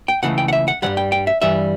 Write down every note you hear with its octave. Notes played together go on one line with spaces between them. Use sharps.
G5
C#2 C#3 E3 A3 F#5
G5
F#5
E5
F#5
G2 E3 G3 F#5
G5
G5
E5
G2 E3 G3 E5